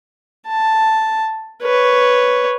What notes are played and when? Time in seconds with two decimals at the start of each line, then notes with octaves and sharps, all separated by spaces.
0.48 A5
1.63 B4 C#5